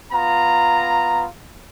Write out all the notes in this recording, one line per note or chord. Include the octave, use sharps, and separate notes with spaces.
B3 F4 A#5